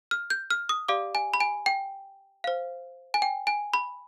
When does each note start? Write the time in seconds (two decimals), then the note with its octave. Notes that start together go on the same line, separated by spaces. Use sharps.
0.11 F6
0.30 G6
0.51 F6
0.69 D#6
0.88 G4 D5 F5 D6
1.15 G#5
1.34 B5
1.40 G#5
1.66 G5
2.44 C5 F5
3.14 G#5
3.22 G5
3.47 G#5
3.74 B5